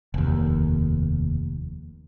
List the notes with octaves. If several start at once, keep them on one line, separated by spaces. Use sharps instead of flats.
F1 D#2